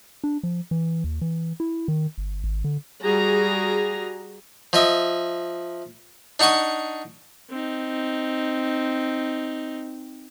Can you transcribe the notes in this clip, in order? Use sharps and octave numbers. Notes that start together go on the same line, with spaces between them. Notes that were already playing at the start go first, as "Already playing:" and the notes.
D4
F3
E3
D#2
E3
E4
D#3
G1
G#1
D3
G3 F#4 G#4 A#5
F3 D#5 E5
D4 D#4 F#5 C#6 D#6
C4 D#4